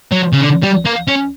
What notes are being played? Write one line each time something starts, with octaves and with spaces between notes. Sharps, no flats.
F#3
C#3
D3
G3
A#3
C#4